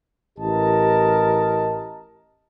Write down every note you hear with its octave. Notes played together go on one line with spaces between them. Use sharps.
A1 G4 A#4 D#5 A5